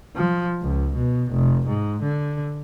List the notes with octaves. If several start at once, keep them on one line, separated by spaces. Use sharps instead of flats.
F3
C#2
B2
F1
G#2
D3